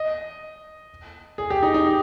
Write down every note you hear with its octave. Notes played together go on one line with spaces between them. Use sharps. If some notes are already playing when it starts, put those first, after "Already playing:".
Already playing: D#5
G#4
G4
D#4
D#4
G4